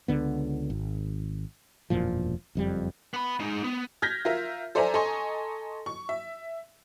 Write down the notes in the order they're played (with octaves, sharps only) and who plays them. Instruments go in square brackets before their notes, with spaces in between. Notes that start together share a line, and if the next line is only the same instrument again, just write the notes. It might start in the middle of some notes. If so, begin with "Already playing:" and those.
[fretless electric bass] C#2 D3 B3
G#1
E1 F#2 A#2 F3
F#1 F2 G3
[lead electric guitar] B3 B5
G#3 D#4
B3
[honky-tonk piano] F6 G6 G#6 A#6 B6
F4 A#4 E5
A4 C5 D5 E5 G#5 A#5
A4 D#5 G#5 A#5 C6 C#6
C#6
E5